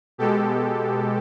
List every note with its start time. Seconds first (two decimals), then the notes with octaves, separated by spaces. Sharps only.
0.18 B2 G#3 G4 A4